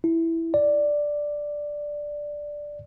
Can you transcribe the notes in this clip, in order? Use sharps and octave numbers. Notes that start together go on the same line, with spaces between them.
E4
D5